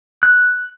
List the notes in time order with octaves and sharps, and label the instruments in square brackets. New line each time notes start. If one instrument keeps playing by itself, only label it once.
[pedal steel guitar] F#6